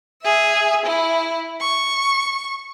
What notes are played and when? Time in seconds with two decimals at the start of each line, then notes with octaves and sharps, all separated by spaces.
0.22 G#4 E5
0.86 E4
1.61 C#6